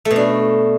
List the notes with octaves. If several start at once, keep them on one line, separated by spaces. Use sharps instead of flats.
A3
B2
D4